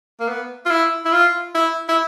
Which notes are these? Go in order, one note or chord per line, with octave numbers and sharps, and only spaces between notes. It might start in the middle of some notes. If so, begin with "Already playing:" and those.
A#3
B3
F4
E4
E4
F4
E4
E4